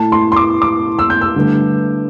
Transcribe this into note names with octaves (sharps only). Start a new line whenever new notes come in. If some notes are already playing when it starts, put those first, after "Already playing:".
Already playing: A2 A3 A5
C6
C6
D6
D6
E6
G6
E6
G2 D3 A3